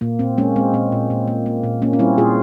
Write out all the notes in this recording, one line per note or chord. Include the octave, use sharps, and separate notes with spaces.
A#2 A#3
A#2 C4
G#3 A#3 C#4
G#3 C4
A#2 C4
A#2
A#2
A#3
A#3
A#2
A#3 C#4
C#4
G3 C4 E4
A#2 F4 G#4